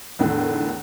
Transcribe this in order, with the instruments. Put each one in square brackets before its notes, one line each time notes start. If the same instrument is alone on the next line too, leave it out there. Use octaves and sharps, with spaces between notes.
[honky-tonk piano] E2 A2 D3 D#3